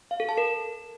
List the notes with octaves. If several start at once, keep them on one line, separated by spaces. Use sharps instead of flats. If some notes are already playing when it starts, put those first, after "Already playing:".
F5
A4
A5
A#4